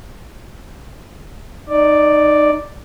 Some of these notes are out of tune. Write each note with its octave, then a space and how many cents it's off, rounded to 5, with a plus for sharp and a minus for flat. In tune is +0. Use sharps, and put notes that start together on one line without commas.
D#4 -20 D5 +0